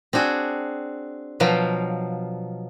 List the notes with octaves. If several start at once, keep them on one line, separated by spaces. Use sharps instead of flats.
C4 D4 F#4 G#4
B2 F3 F#3 F5 G5